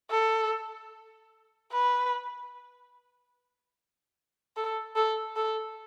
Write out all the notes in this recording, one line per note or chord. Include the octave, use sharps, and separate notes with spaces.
A4
B4
A4
A4
A4